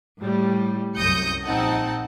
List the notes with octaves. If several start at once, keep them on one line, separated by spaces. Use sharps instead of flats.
A2 G3
C2 F#2 D#6 G6 A#6 C#7
A#1 C4 D#4 F#5 A5